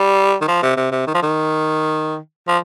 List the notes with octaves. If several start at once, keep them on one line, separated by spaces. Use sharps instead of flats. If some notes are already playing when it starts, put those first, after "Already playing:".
Already playing: G3
D#3
F3
C3
C3
C3
D#3
F3
D#3
F3